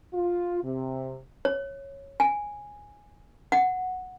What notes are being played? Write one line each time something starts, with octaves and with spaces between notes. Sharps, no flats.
F4
C3
C#5
G#5
F#5